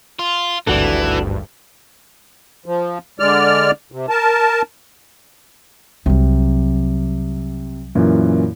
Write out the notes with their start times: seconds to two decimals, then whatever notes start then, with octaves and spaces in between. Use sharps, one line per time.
0.19 F4
0.67 G#1 D2 G2 E3 D4 F#4 A4
2.66 F3
3.20 D3 G#3 D5 F6
3.92 C3
4.09 A#4 A5
6.06 C2 C3 F#3
7.95 F#2 A#2 E3